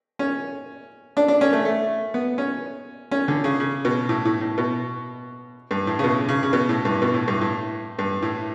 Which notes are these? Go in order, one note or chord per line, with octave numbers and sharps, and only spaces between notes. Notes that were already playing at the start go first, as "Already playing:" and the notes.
C#4
D4
D4
C#4
A3
A3
B3
C#4
C#4
D3
C#3
C#3
B2
A2
A2
A2
B2
G2
A2
C#3
B2
C#3
C#3
B2
A2
G2
B2
A2
G2
A2
G2
A2